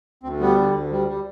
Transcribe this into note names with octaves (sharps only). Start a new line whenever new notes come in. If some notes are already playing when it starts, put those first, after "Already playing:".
D2 C4
G3 B3
D3
D2
G3
G3